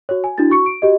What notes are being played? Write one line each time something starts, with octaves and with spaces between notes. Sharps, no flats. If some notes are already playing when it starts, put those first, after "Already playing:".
F#4 C#5
G#5
D4 E4 F#4 A6
F#4 C#6 C#7
D7
F#4 G4 D#5